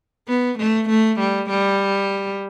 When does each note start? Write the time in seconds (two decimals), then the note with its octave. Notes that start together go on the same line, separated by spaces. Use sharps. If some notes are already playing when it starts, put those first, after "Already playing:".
0.28 B3
0.59 A3
0.89 A3
1.19 G3
1.50 G3